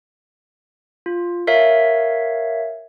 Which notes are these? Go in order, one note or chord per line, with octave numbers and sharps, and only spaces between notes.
F4
A#4 C#5 E5 F5